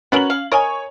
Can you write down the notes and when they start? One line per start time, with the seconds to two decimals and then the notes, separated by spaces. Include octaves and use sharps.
0.12 B3 C#4 F#4 A#4 F#7
0.30 F5
0.52 A#4 C#5 D#5 G#5